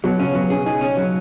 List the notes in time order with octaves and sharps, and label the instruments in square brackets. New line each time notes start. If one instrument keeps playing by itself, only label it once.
[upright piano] B2 [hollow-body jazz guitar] F#3
[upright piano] C#3 [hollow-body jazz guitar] C#4
[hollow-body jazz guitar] F#3 [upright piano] B3
[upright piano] C#4 [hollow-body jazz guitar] G#4
[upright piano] D#4 [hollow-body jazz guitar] G#4
[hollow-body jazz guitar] C#4
F#3